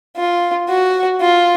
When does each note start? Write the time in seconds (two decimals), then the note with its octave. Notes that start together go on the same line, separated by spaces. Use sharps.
0.16 F4
0.69 F#4
1.21 F4